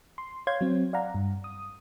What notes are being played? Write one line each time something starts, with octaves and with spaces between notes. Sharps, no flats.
C6
C#5 F5 C6 G6 G#6
F#3 C4
D5 F5 F#5 A#5
G2
D#6